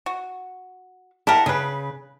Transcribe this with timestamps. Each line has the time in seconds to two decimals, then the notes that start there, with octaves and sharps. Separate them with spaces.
0.06 F#4
1.27 E4 G4 A#4 F#5 A5
1.46 C#3 G#4 B4